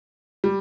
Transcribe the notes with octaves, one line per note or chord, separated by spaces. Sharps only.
G3